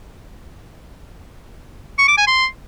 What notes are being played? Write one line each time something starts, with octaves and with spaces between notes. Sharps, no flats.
C#6
D6
G#5
C6